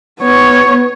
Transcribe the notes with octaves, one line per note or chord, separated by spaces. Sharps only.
B3 C#5